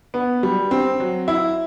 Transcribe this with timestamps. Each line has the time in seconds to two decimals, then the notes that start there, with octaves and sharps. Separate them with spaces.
0.14 B3
0.43 G3
0.71 C4
1.00 F#3
1.28 E4